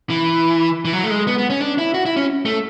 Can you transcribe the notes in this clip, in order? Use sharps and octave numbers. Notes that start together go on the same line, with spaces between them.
E3
E3
F#3
A3
G#3
B3
B3
C#4
D4
E4
F#4
E4
C#4
A3